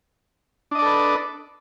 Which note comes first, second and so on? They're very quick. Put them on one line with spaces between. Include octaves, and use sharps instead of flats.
D4 D#5 D5 A4 B4